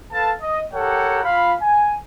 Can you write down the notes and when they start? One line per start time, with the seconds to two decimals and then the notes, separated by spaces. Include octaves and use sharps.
0.12 A4 B4 F5 A5
0.41 D#5
0.73 G4 A4 A#4 C#5 F#5 G5
1.24 F4 F5 B5
1.61 G#5